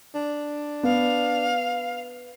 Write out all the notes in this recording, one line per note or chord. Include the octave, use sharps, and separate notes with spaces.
D4
B3 F5